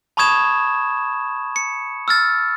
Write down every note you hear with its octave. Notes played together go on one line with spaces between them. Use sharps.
A5 B5 C#6 D#6 G#6 E7
C#7
E6 F6 A6